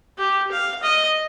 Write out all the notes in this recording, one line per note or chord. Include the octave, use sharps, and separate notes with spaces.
G4
F5
D#5